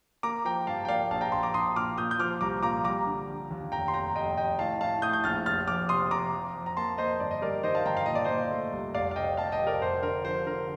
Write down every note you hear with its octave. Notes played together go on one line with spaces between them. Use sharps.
A#3 A#5 D6
F3 G5 A#5
G2 F5 A5
G5
A#3 D5 F5
A#1 F5 A5
G5 A#5
A#1 A5 C6
A#5 D6
A#1 C6 D#6
A#2 D6 F6
A#2 D#6 G6
G6
F3 D6 F6
C2 A#5 D6
A#2 A#5 D6
G3 A#5 D6
D3
G3
D#2
F1 G5 A#5
C6
F1 G5 A#5
F1 D#5 G5
F1 D#5 G5
A2 F5 A5
A2 F5 A5
A2 D#6 G6
G6
A#1 F6 A6
F1 F6 A6
F2 D6 F6
C3 C6 D#6
C3 A#5 D6
F2
F2
A#5
A#3 A5 C6
A#3 C5 D#5
G1 D5
D#5
G3 A#4 D5
D#3 C5 D#5
F5 A5
G1 G5 A#5
F5
A#2 D#5
D5
A#2 C5 D#5
A3
C2
F1 D5 F5
F5
C3 D#5 G5
F1 F5 A5
D#5 G5
C3
A#4 D5
F1 C5
D3 A#4
F3 C5
D3 A#4